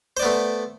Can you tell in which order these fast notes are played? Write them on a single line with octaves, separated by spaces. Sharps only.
C5 D5 B3 A3